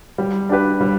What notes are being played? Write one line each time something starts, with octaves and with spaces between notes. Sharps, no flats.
G3
D4 G4 B4
G3